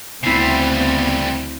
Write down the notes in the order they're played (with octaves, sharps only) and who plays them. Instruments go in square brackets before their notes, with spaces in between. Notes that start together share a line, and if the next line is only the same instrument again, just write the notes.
[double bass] D2 C4 [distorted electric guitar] C#3 G3 [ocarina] B3 [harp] E4 C7